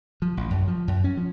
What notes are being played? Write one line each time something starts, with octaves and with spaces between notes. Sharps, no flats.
F3
A1
F#2
F3
F#2
C#4
F3